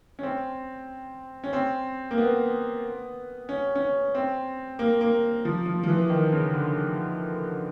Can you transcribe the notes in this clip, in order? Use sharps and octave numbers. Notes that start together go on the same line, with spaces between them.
C#4
C4
C#4
C4
A#3
B3
C#4
C#4
C4
A#3
A#3
F3
F3
F3
E3
D#3
C#3
D3